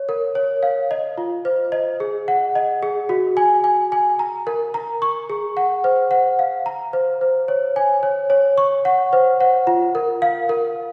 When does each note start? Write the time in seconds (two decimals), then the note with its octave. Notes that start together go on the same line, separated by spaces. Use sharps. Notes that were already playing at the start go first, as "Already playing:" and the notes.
Already playing: C#5
0.09 A#4
0.35 C#5
0.63 F5
0.91 D#5
1.18 F4
1.45 C5
1.72 D#5
2.00 G#4
2.28 F#5
2.55 D#5
2.83 G#4
3.09 F#4
3.37 G#5
3.64 G#5
3.92 G#5
4.19 A#5
4.47 A#4
4.74 A#5
5.02 C#6
5.30 G#4
5.57 F#5
5.84 C5
6.11 F#5
6.39 F5
6.66 A#5
6.93 C5
7.21 C5
7.48 C#5
7.76 G#5
8.03 C#5
8.30 C#5
8.58 C#6
8.85 F#5
9.13 C5
9.41 F#5
9.67 F4
9.95 A#4
10.22 F5
10.49 A#4